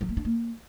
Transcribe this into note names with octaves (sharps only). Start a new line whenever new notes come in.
F#3
A#3
D4
A#3